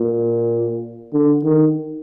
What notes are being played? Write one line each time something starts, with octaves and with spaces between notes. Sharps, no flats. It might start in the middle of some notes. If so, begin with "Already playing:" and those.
Already playing: A#2
D3
D#3